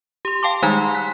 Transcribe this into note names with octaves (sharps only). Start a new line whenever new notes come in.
G4 C6
F5 G5 A5 C6 D6
D#3 G3 G#3 D#4 G#5 C6
F#6 B6